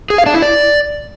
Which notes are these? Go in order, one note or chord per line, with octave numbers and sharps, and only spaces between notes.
G#4
F5
D4
E4
D5